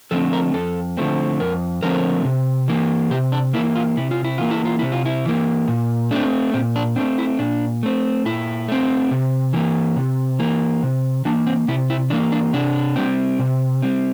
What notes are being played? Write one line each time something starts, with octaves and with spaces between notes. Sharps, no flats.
D3 F3 A3 C4 A4
A#4
F2 A4
D3 F3 A3 C4
F2 A#4
D3 F3 A3 C4 A#4
C3
E3 A#3
C3 G4
D4
E3 A#3 E4
F4
C3 E4
F4
E4
E3 A#3 F4
E4
F4
C3 E4
F4
E4
E3 A#3
A#2
A3 C4 D4
A#2 C4
D4
A3 C4 D4
E4
A#2 D4
A3 C4
A#2 E4
A3 C4
C3
E3 A#3
C3
E3 A#3
C3
E3 A#3 D4
C4
C3 E4
E4
E3 A#3 D4
D4
C3 D4
G3 C4
C3
G3 C4